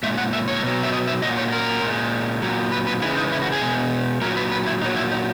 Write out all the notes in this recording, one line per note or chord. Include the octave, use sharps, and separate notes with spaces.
A#2 G#3 E5
F#5
E5
C#5
B2 F#3
E5
D#5
E5
A#2 F#3 D#5
C#5
A#4
A#2 G#3
A#2 F#3
B4
B4
C#3 E3 G#3 E4
D#4
E4
F#4
G#4
B2 G#3
A#2 F#3 A#4
B4
B4
E4
A#2 F#3 D#4
E4
D#4